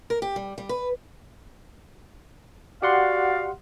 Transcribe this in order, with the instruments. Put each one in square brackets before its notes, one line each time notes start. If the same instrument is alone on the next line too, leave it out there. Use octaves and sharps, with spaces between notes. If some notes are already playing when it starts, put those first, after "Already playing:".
[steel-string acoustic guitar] A#4
G4
G3
G3
B4
[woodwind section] F#4 D5 F5 [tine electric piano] G4 F#5 C6